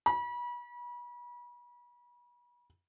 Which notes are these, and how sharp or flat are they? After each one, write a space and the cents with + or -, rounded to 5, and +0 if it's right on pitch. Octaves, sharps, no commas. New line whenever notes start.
B5 -35